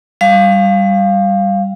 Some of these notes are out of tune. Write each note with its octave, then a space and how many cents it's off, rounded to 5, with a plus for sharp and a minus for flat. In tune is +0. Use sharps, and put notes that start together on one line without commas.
G3 +0 F5 +0